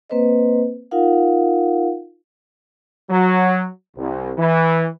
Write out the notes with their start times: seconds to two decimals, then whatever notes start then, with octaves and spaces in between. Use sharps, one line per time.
0.10 A#3 C4 B4 C5 D#5
0.91 D#4 F4 A#4 F5 F#5
3.10 F#3
3.97 C2
4.38 E3